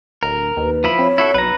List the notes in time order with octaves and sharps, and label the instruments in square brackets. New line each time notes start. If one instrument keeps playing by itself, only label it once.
[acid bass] D1 [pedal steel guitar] A#4
[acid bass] D#2 [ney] B4
[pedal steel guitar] F3 E4 B5
[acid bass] C4 [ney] C#5
[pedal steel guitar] E4 F#4 A4
[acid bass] B1 [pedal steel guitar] B4 A#5